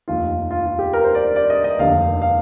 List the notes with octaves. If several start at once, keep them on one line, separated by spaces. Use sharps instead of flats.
F1 D#2 D#3 F4
F4
F4
G4
A#4
C5
D5
D5
D#5
D#5
F1 D#2 D3 F5
F5